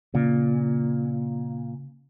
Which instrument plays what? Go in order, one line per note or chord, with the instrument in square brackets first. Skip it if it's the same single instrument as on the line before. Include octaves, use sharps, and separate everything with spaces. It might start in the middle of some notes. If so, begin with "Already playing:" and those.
[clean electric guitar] A#2 [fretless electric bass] C#3